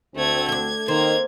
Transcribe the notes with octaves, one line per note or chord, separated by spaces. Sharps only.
D2 A3 C4 G#6
A3 D4 G#6
D#3 A#3 C4 G#6